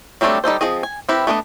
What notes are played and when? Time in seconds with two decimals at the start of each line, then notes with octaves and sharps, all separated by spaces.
0.21 F#3 G3 A3 C4 D4
0.44 G3 D#4 A4 C5
0.61 F3 C4 G#4 D#5
0.83 G#5
1.09 C4 E4 G4 B4
1.27 A3 B3 D4 A#4 D#5